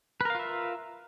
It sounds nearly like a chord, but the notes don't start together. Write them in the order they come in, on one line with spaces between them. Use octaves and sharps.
B4 A#4 F5 F4 E5